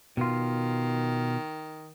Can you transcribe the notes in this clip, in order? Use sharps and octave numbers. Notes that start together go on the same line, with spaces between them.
B2 D#3 F4